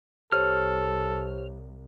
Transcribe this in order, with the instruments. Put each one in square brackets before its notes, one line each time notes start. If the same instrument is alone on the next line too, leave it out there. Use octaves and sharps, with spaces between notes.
[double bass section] C2 [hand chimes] G4 C5 C#5 [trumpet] A4 [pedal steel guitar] F6